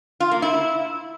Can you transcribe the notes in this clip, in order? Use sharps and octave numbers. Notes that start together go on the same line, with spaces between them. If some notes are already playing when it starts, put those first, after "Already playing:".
F4
A#3
E4